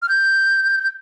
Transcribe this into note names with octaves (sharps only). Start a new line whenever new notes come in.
F6
G6